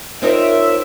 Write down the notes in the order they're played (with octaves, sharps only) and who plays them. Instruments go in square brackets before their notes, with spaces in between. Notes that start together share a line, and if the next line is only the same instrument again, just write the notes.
[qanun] C4 D#4 A#5 [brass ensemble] F4 C5 C#5 [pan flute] A#4 [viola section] E5